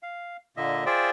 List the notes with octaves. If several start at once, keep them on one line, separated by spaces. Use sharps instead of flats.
F5
A#2 D3 A#3 D#5 E5
F4 G#4 C5 D5 E5 G5